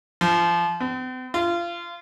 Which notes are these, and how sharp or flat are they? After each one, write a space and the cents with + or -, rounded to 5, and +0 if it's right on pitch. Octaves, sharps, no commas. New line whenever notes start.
F3 -25
C4 -45
F4 -25